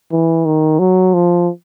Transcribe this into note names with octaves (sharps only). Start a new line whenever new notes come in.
E3
D#3
F#3
F3